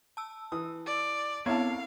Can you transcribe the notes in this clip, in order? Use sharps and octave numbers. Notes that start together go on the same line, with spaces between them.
A5 E6
E3 D#6
D5
B3 C4 E4 C#5 E5 F5 A5